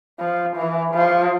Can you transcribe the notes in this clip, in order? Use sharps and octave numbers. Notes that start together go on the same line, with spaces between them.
F3
E3
F3